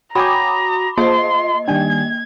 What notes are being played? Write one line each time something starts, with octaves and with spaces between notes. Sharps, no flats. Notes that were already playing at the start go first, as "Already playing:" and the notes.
F#4 C#5 G5 G#5 A#5 B5 D6 D#6
A#3 F4 C5 D#5 C6
D#3 G3 D4 G5 G#5 G#6